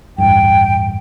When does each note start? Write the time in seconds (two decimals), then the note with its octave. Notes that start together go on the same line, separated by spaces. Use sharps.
0.18 A1 E2 G2 G5